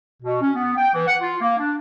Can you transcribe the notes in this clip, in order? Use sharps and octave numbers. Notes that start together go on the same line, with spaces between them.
B2
C#4
B3
G5
E3
F#5
F4
A#3
D4